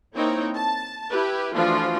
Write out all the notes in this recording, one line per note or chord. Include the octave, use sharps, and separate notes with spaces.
A#3 C4 D#4 E4 C#5 G5
A5
E4 G4 B4
E3 F3 A3 D4 F4 F#4